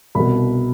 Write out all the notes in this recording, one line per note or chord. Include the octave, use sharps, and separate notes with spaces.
C2 B2 B5